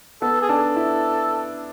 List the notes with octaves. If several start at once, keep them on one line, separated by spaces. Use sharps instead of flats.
B3 A4
G#4
D4 A4
E4